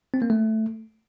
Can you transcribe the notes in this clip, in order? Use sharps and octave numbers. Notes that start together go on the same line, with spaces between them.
C4
A#3
A3